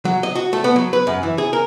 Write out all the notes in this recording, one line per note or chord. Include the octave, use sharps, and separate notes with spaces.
F#3
D#5
F#4
A3
B3
F#3
B4
F#2
E3
G#4
A#4